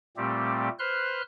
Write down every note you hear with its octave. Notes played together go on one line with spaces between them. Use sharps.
A#2 G3 A3 C4 G4
B4 C5 C6 F6 F#6